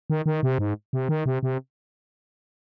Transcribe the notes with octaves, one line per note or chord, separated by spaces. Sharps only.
D#3
D#3
C3
G#2
C3
D#3
C3
C3